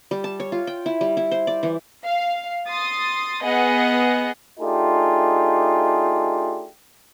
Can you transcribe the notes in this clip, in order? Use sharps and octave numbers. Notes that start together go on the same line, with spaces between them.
G3
A5
C#5
F4
G5
E4
G3
E4
C5
D5
E3
F5
C6 D#6 A6
B3 G#4 D#5 F#5
A3 D4 D#4 F4 G4 G#4